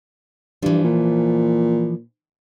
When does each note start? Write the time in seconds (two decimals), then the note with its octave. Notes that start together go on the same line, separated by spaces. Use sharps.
0.62 G2 E3 F3
0.84 A#2